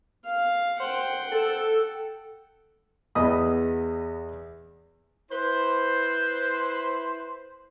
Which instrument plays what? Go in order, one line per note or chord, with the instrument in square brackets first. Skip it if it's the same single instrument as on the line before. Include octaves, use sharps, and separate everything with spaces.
[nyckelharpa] F5
[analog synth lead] C5 [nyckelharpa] F#5 G5
[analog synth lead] A4
[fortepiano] E2 B3 D#5 B5 D#6
[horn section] E4 B4 C5